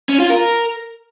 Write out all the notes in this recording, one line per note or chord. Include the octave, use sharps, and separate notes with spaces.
C#4
F4
A#4